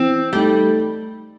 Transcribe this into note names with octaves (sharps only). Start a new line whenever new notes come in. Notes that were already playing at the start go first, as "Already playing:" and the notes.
Already playing: E3 C4
G3 A3 D#4 A4